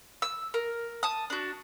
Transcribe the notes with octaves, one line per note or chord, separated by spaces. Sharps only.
E6
A#4
A5 D#6
D4 F#4